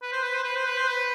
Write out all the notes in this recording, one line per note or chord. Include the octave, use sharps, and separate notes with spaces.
B4
C5
B4
C5
B4
C5
B4
C5
B4